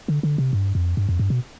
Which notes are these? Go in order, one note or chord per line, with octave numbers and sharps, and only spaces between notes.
D3
D3
C3
G2
F2
G2
F2
G2
B2